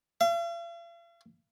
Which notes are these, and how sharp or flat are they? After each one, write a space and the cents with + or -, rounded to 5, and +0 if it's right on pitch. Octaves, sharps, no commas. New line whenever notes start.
F5 -45